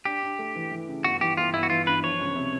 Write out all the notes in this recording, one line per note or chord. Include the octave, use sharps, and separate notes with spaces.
D4 G4
D4
A3
E3
E3
C#3
G1 F#4
E3 G4
G1 F4
G1 E4
F#4
E3 F4
G2 B4
F3 C#5
C#2
C3